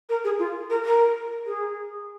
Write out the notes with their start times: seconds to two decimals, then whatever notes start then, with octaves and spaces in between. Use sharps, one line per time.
0.09 A#4
0.24 G#4
0.39 F4
0.70 A#4
0.85 A#4
1.46 G#4